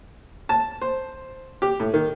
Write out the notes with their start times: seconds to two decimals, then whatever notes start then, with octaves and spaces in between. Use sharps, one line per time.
0.49 A5
0.82 C5
1.62 G4
1.80 A2
1.94 D#3